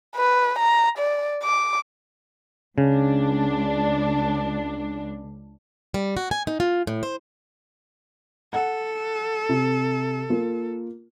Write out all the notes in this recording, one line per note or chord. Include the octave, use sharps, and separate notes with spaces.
B4
A#5
D5
D6
C#2 C#3 D4
G3
F#4
G#5
D#4
F4
A2
C5
A4 F#5
C3
A#3 F4